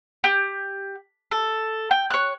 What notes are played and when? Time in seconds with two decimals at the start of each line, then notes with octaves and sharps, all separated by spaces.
0.24 G4
1.31 A4
1.91 G5
2.10 C#5 F#6